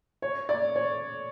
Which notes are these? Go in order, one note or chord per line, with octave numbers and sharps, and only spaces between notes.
C#5
D5
C#5